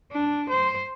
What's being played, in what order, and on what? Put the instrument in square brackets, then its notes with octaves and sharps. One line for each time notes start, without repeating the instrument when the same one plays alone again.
[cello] D4
C5